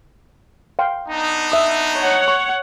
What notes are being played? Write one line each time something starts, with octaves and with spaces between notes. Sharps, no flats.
F5 G5 C6
B3 D4 D#4
E5 D#6
C#5 F#5
C#6